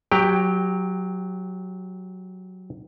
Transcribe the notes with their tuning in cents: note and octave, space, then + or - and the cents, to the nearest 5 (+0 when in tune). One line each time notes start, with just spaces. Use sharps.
F#3 +0 G4 +15 G5 +0